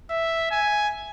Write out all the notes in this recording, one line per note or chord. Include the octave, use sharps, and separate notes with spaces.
E5
G#5